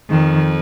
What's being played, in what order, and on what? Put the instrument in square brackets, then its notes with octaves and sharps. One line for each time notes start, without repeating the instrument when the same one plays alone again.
[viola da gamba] F2 [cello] D#3